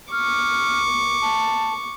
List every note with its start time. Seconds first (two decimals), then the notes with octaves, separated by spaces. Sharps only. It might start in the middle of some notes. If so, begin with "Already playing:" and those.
0.12 C#6 D6 F6
1.22 A5